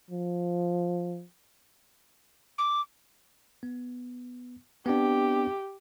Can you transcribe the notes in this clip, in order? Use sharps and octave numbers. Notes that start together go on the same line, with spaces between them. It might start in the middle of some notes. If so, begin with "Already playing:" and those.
F3
D6
B3
B3 C4 D4 G4